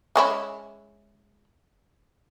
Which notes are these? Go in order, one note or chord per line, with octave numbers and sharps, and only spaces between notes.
G#3 C#4 E4